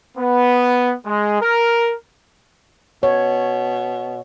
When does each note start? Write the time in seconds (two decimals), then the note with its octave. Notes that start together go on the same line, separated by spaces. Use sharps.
0.18 B3
1.06 G#3
1.41 A#4
3.03 B2 C#5